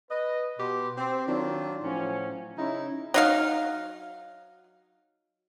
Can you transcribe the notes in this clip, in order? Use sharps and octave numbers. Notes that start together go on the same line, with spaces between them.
B4 D#5
B2 F#4 G4 B4 C6
C4
D#3 F#3 D4 F4
A2 F3 F#3 C#4
C#3 C#4 D#4 E4
F#3 D#4 F5